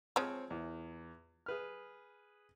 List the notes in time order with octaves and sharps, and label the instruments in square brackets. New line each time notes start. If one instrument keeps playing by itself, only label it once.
[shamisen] F3 G#3 [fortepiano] C4 C#5
[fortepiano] E2
G#4 B4 F6